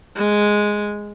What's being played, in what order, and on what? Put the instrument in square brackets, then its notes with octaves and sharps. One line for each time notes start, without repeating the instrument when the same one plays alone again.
[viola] G#3